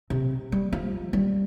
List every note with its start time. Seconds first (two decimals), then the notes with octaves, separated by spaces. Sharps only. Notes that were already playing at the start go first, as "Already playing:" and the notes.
0.10 C3
0.52 G3
0.73 F3
1.13 G3